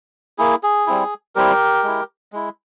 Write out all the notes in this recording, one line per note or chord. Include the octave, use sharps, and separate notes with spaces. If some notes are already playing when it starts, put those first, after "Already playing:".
A#3 E4 G#4
G#4
G3 C4 E4
G3 C4 E4 G4 A#4
G#3 E4
G#3 E4